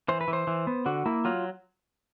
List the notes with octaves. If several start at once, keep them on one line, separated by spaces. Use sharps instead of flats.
E3 C5
B4
E3
C5
E3
B3
D3 F#4
A#3 E4
F#3 F4